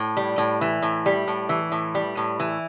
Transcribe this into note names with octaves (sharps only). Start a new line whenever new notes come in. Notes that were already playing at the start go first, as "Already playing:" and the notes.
Already playing: A2
G3
A2
E3
A2
G3
A2
E3
A2
G3
A2
E3